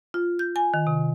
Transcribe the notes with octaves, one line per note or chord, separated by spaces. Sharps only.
F4
G6
G#5
D#3
C3